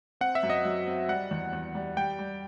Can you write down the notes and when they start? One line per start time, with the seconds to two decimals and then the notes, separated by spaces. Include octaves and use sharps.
0.21 C4 F#5
0.35 E5
0.43 F#2
0.50 D#5
0.65 F#3
0.87 C4
1.08 G3 F#5
1.31 E2
1.53 E2
1.75 G3
1.97 G3 G5
2.19 G3